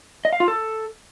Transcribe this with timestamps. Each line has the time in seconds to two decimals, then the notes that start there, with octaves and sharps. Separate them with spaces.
0.25 D#5
0.33 F5
0.40 F4
0.48 A4